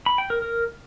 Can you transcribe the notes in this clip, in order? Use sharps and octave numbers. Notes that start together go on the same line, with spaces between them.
B5
G5
A#4
A#4